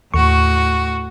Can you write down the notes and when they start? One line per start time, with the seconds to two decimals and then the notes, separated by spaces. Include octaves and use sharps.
0.14 D#2 A2 F#4 C#6